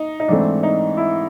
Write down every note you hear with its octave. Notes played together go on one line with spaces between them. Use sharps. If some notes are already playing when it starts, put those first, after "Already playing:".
Already playing: D#4
D#4
G#2 E3 A3 C4 D4
D#4
E4